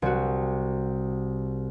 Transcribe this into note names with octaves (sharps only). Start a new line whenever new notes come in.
C2 F#4